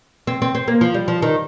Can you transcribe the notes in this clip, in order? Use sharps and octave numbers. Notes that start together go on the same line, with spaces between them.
C4
C4
C4
A#3
F3
G3
F3
D#3